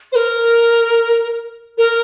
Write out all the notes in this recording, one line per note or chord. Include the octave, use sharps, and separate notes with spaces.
C5
A#4
A#4